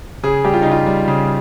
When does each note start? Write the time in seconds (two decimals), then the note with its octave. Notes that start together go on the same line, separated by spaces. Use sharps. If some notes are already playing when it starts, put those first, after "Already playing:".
0.23 C#3 G#4
0.44 G3 G4
0.54 F4
0.62 C#3 D#4
0.72 F4
0.86 G3
1.08 C#3